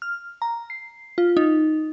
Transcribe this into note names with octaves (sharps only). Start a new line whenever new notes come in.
F6
A#5
C7
F4
D#4